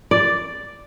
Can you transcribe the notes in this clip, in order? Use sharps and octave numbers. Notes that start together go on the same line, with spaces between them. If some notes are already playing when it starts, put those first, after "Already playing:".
D5